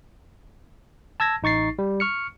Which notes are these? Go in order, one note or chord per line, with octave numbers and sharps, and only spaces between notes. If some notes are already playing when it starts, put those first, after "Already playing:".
A5 E6 G#6 A#6
A1 D#4 C#6 A6 C7
G3
C#6 F6 C#7